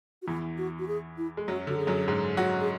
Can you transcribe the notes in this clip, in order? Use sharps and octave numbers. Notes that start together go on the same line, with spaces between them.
F#4
E2 E3 E4
F#4
F#4
G#4
E4
G#3
F#2 F#3 F#4
D3 F#4
G#4
F#2 F#3
G#2 G#3
F#3 F#4
G#4